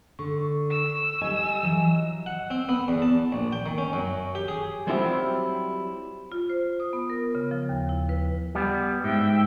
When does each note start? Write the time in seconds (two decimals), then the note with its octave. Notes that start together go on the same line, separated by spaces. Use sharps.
0.19 D3 C#6
0.71 E6
1.21 G3 D#5 G#5
1.63 E3 F#3
2.26 F#5
2.51 C4
2.69 B3
2.88 E2
3.02 A5
3.32 A#1
3.52 G5
3.66 D#3
3.78 C#4
3.93 F#2
4.35 G4
4.48 G#4
4.87 F#3 G3 C4 E4 F4 G4
6.32 F4
6.50 C5
6.80 D#6
6.93 B3
7.10 A#4
7.35 C#3
7.51 F3
7.69 D#2
7.89 E4
8.09 B4
8.55 G3 B3
9.04 G#2 E5 G5